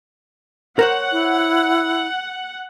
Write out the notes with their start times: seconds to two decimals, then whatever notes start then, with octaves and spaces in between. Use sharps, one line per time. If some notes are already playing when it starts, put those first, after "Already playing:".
0.79 A#4 C5 C#5 F#5
1.12 E4